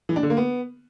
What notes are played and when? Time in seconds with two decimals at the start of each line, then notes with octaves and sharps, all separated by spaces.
0.09 E3
0.16 D4
0.23 D3
0.30 A#3
0.37 B3